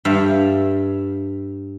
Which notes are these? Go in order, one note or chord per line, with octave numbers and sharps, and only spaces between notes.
G2 E5 F5